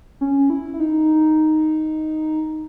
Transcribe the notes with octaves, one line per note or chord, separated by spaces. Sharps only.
C#4
E4
E4
D#4